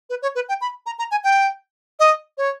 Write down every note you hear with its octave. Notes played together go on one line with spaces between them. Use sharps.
B4
C#5
B4
G5
B5
A#5
A#5
G#5
G5
D#5
C#5